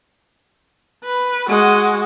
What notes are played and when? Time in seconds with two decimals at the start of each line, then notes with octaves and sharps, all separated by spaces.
1.05 B4
1.49 G#3 F#4